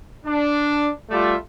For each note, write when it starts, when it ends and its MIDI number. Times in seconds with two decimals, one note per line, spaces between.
0.25 0.89 62
1.10 1.34 55
1.10 1.34 57
1.10 1.34 65
1.10 1.34 74
1.10 1.34 76